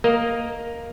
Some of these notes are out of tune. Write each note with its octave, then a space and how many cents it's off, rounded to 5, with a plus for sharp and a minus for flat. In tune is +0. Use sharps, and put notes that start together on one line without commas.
A#3 +0 A#4 +0 D#5 +0